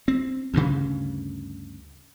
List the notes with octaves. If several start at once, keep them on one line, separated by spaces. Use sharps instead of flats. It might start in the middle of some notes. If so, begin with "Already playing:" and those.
C4
D2 G2 C#3